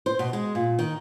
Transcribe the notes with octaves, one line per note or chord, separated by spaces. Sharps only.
C5
B2
G#3
A#2
D#3